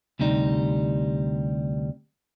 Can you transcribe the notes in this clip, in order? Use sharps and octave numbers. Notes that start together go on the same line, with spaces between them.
D2 C3 G3 D#4